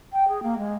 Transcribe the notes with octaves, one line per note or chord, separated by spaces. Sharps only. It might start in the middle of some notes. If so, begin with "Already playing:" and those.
G5
G#4
A#3
G#3